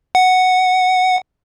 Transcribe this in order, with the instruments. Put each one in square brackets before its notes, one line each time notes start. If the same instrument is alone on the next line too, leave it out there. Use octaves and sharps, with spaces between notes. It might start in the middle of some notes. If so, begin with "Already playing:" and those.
[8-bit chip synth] F#5